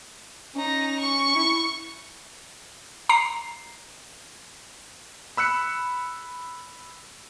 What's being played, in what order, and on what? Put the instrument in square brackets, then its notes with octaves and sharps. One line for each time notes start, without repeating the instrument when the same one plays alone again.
[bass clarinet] C#4 [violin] D#4 A#5
[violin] C#6
[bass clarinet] E4
[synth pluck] A#5 C7
[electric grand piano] B5 E6 F#6 C#7